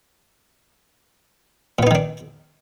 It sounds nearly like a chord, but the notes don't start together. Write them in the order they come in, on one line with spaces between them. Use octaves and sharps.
A#2 B3 D#4 D#3 D4